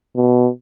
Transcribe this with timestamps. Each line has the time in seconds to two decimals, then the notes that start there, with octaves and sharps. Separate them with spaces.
0.16 B2